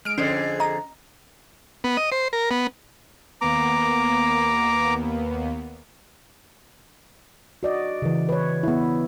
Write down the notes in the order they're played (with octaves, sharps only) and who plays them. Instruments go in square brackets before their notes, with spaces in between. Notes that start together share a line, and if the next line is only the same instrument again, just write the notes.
[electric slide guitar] G#3 [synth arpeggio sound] F6 D7
[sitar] F2 D3 [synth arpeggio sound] C#4 [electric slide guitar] G#4 C5
[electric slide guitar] G#4
[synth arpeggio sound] D#5 A#5
[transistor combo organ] B3
D#5
C5
A#4
B3
[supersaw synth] D#2 A#3 B3 [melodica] A#5 D6
[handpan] F#4 D5 D#5
C#3 E3
B4 C#5
B3 E4